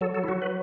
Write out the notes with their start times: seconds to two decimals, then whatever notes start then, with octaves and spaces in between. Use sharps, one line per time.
0.01 F#3 A4
0.14 A4
0.24 E4
0.28 F#3 F#4
0.42 B4